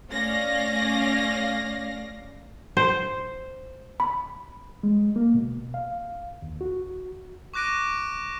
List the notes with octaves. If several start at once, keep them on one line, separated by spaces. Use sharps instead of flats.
A3 C#4 D5 F5 A#6
C5
B5
G#3
A#3
B2
F5
D#2
F#4
C#6 D6 F#6 A#6 D7 D#7